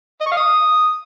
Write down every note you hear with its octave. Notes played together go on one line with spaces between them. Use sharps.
D#5
C#6
F5
D#6